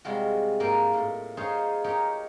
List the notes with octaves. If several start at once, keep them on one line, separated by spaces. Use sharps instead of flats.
C3 G3 G#3 F4 F#4
G#2 A#3 A#4 G5 G#5
A2
D#4 F4 G#4 C5 C#5 F5
D#4 G4 A#4 C#5